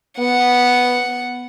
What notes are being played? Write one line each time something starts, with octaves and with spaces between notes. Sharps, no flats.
B3 F#5